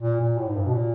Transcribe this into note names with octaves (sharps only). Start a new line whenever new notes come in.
A#2
A#2
A2
G#2
G2
B2
A#2